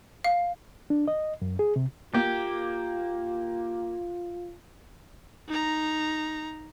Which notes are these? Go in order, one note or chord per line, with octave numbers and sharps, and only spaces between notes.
F5
D4
D#5
F#2
G#4
C3
A#3 F4 G4
D#4 A#5